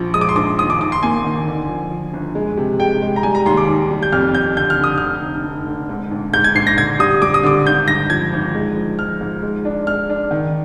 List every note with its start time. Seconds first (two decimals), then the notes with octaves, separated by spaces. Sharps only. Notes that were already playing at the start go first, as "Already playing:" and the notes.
Already playing: A#1 F3
0.14 G#3 D#6
0.21 D6
0.29 C6
0.36 A#1 D6
0.59 D#2 D#6
0.70 D6
0.80 D#2 D6
0.92 C6
1.03 A#3 G#5
1.25 D#3
1.47 D3
1.69 F3
1.91 F3
2.13 G1
2.35 G#3
2.57 C3
2.80 G#3 G5
3.02 G#3
3.16 A#5
3.23 G3 G#5
3.35 A#5
3.46 D#2 C6
3.57 D6
3.68 D#2
3.90 G3
4.03 G6
4.12 F2 F6
4.35 F2 G6
4.57 D3 G6
4.70 F6
4.79 D3 D#6
4.98 F1 F6
5.23 F1
5.45 F1
5.66 D3
5.89 G#2
6.11 A#1
6.33 G#2 G6
6.44 G#6
6.55 A#1 C7
6.67 A#6
6.77 D3 G#6
6.99 G3 D#6
7.22 G3 D6
7.34 D#6
7.43 D3 D6
7.66 G#1 G6
7.88 G2 A#6
8.10 F3 G#6
8.33 G#1
8.55 G#3
8.76 F3
8.98 F3 F6
9.21 G#2
9.43 G#3
9.65 D4
9.87 G#3 F6
10.09 D4
10.31 D#3